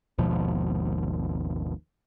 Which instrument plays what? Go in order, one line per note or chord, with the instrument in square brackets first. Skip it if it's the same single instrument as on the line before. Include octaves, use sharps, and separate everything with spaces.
[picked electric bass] G#1 D#2 B2 F3